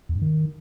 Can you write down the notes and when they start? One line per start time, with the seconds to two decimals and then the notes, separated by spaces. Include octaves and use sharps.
0.09 E2
0.15 G2
0.22 D#3